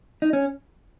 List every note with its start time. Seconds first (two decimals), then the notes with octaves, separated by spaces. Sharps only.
0.22 D#4
0.33 C#4